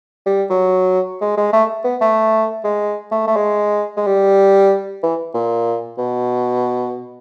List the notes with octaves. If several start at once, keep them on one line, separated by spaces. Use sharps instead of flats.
G3
F#3
G#3
G#3
A3
B3
A3
G#3
A3
A3
G#3
G#3
G3
E3
A#2
B2